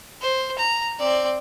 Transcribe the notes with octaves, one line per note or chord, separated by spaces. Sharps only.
C5
A#5
C4 D5